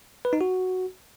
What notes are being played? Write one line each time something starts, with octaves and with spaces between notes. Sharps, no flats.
B4
D#4
F#4